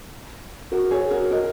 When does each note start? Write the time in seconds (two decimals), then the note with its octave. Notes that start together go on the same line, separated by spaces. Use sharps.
0.72 F#4 A#4
0.91 G#4 C#5
1.11 F#4 A#4
1.31 A#4 D#5